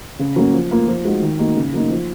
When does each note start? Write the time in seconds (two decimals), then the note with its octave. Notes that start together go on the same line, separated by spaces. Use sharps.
0.19 C#3
0.36 F#3 A#3 C#4
0.53 F3
0.71 A#3 F4
0.87 F3
1.05 G#3 D#4 F#4
1.22 D#3
1.38 A#3 D#4 F#4
1.56 C#3
1.73 F#3 A#3 D#4
1.90 F3